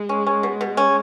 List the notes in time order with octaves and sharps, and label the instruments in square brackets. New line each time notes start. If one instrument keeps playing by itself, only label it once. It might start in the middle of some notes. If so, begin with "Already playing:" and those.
Already playing: [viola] G#3
[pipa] C#4
C#4
B2
B2
C#4